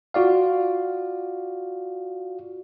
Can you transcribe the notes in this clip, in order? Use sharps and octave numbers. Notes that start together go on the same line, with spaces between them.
F4 F#4 D5 F5